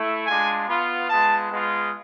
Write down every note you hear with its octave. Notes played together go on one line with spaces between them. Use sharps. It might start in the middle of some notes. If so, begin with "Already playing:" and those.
Already playing: A3 E4
G#3 D4 F4 G#5
B3 F4
G#3 B3 F4 A5
G#3 B3 F4